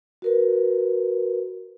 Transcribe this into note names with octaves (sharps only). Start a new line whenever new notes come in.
F#4 A#4 B4